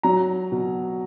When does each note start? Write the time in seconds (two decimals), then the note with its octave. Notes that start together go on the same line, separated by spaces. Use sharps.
0.03 F#3 A#5
0.52 B2